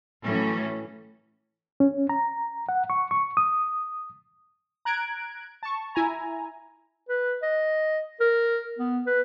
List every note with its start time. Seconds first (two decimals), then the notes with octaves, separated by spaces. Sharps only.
0.24 A2 E3 F#3 C#4
1.80 C#4
2.09 A#5
2.69 F#5
2.90 C#6
3.11 C#6
3.37 D#6
4.85 A#5 F#6 G#6 D7
5.63 A5 C#6
5.95 E4 G#5 A#5
7.09 B4
7.43 D#5
8.20 A#4
8.79 B3
9.07 B4